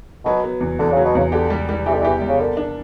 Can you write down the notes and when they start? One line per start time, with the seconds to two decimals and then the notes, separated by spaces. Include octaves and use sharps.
0.25 B2 F#3
0.44 B3
0.61 E2
0.79 E2 D3
0.92 C#3
0.97 F#3
1.04 B2
1.15 E2 C#3
1.32 D3 G4
1.50 G3
1.69 G3
1.86 E3 G4
1.94 D3
2.02 E3 G4
2.22 G3
2.28 C#3
2.40 D3 A#3
2.57 D4